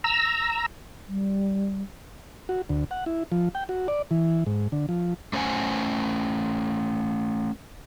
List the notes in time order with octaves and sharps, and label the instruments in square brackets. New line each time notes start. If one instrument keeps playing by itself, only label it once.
[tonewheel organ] A#5 E6
[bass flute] G3
[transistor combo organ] F#4
D2
F#5
E4
F3
G5
F#4
D5
E3
G#2
D3
F3
[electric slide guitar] A3 C#4 C5 D5 F#5 G#5